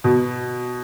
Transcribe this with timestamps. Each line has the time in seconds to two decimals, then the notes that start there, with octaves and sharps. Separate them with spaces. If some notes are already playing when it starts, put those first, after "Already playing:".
0.04 B2